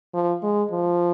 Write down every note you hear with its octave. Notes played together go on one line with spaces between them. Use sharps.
F3
G#3
F3